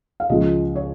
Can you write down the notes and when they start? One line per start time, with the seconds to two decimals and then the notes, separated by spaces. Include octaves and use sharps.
0.20 F5
0.29 C#2 C#3 F3 G#3 D#5
0.76 C#5